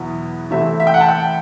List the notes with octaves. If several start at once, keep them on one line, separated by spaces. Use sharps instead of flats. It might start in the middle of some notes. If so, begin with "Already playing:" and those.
Already playing: E2 B2 F#3 B3 E4
C3 E3 A3 C4 E4 E5
E5
G5
F#5
A5
G5